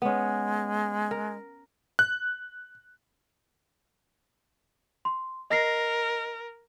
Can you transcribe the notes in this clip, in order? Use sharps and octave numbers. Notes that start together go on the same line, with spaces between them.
G#3 B3 C#4
A#4
F#6
C6
A#4 D#5 A#6 C7